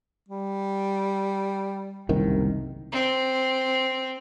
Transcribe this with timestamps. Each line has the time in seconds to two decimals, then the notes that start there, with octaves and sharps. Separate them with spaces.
0.29 G3
2.09 F#1 C2 D#3
2.92 C4